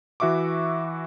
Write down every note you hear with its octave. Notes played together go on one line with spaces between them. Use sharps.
E3 F#4 E5 C#6 D6